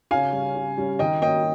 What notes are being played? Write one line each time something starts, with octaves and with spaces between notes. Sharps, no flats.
C#3 F5 G#5
G3 C#4
C#3
G3 C#4
D#3 D#5 G5
A#3 C#4 D#5 G5